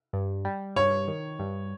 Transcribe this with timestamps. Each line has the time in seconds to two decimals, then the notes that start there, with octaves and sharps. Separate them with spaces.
0.13 G2
0.45 G3
0.76 G2 C#5
1.07 D#3
1.39 G2